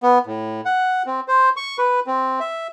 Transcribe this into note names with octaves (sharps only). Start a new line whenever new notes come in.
B3
A2
F#5
C4
C5
C#6
B4
C4
E5